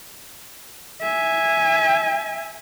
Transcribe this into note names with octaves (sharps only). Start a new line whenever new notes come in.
E5 G#5